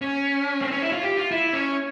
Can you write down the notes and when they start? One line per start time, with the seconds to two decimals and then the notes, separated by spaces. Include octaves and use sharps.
0.02 C#4
0.61 C4
0.71 C#4
0.82 E4
0.92 F4
1.03 G4
1.17 F4
1.31 E4
1.53 C#4